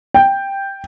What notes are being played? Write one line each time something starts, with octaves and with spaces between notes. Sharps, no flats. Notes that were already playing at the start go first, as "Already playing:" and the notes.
G5